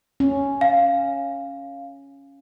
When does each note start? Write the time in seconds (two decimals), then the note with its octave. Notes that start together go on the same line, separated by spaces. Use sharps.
0.20 C#4
0.61 F5